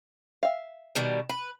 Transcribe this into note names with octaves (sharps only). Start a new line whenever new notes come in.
E5 F5
B2 D#3 G3
B4 B5